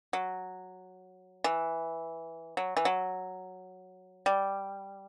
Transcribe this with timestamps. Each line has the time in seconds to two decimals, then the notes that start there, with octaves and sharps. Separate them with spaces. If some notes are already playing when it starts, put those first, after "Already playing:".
0.13 F#3
1.44 E3
2.57 F#3
2.77 E3
2.85 F#3
4.26 G3